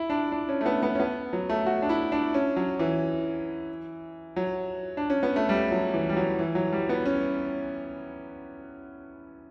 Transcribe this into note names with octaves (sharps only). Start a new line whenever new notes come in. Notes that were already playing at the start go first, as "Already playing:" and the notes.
Already playing: E4
D4
D4
C#4
A3
B3
B3
C#4
B3
F#3
A3
F#4
D4
E4
D4
C#4
F#3
E3
F#3
D4
C#4
B3
A3
G3
F#3
E3
G3
F#3
E3
F#3
G3
B3
C#4